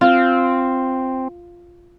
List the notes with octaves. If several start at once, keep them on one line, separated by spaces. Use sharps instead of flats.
C4 F4